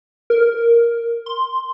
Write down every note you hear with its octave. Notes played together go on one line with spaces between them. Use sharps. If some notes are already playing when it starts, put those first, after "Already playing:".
A#4
C6